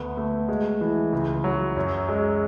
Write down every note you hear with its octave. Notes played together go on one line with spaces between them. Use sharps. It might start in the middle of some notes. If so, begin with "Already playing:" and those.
Already playing: D2 B3
A3
G#3
E3
C#2
F#3
F#2
G#3